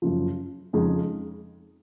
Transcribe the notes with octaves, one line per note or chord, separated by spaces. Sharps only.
F#2 C#3 F3
F2 C#3 G#3 D#4 G#4